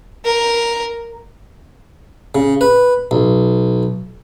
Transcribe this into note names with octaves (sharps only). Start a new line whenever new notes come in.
A#4
C#3
B4
B1